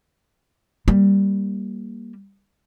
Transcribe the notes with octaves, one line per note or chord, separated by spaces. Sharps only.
G3 A#3